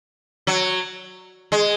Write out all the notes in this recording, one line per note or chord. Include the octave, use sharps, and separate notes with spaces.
F#3
G#3